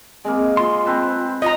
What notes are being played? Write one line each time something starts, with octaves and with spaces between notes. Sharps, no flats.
G#3 A#3 C4
F4 C6
C4 B4 A5
F4 D#5 A#5